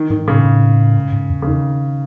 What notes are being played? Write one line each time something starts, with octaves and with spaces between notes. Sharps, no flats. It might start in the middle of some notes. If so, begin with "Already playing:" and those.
Already playing: D#3
G#2 D#3
A2 C#3
A2
G#2
G#2
E2
C#3
D#3